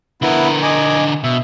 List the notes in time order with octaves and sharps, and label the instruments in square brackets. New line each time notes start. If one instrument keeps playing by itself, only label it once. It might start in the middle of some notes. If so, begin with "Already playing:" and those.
[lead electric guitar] D3 A#4 [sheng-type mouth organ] B3 E4
[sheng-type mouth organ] D#5 G#5 D6
[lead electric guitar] B2 [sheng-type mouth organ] E5